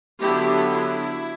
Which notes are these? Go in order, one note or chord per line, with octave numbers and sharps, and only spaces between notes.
D3 F#3 B3 D4 E4 G4
E4